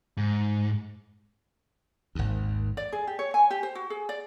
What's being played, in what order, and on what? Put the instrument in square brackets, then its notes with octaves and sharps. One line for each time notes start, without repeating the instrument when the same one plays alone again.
[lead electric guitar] G#2
[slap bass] G#1 D#2
[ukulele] D5
G#4
G4
C#5
G#5
G4
C5
F#4
G#4
D5